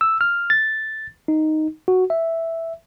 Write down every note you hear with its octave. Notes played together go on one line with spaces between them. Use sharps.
E6
F6
A6
D#4
F#4
E5